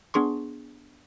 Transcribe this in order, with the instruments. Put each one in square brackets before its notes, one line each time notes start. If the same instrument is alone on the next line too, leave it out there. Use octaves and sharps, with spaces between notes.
[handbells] B3 D4 G#4 C6 C#6